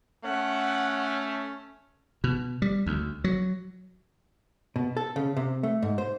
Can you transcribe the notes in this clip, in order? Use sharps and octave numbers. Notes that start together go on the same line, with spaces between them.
A3 C#4 F#5
B2
G3
D2
F#3
B2
A4
C#3
C3
A3
G#2
C5